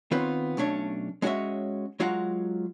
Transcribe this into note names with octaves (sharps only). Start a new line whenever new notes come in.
D#3 B3 C4 F4 B4 C#5
B1 A3 C#4 D4 C#5
G#3 C#4 F#4 C5 C#5 E5
F#3 G#3 F4 F#4 F5 F#5